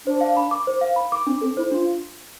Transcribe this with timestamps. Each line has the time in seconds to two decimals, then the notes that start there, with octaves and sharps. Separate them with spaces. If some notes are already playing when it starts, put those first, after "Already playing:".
0.06 D4 C5
0.21 F5
0.37 B5
0.51 D6
0.67 C5
0.81 F5
0.96 B5
1.12 D6
1.27 C4 D4
1.41 C4 A4
1.57 E4 C5
1.72 D4 F4